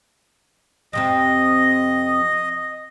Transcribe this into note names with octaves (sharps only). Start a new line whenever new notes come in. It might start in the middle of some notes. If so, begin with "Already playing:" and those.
F2 C3 C4 D#5